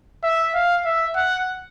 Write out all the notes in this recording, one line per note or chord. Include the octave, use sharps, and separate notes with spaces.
E5
F5
E5
F#5